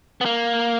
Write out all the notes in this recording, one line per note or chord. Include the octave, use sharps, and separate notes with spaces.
B3
A#3